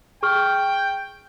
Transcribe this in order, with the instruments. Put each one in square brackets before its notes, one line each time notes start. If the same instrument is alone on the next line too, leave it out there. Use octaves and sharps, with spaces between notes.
[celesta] G#4 C#6 F6 [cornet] G5